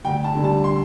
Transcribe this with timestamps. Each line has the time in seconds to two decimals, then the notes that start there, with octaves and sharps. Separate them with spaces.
0.05 D2 G5
0.24 A5
0.35 D3 G3
0.44 A5
0.64 C6